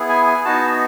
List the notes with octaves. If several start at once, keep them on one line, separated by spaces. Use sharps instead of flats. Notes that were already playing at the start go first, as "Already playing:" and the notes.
Already playing: B3 E4 G#4
G#5
G#5
B3 D#4 F#4 A5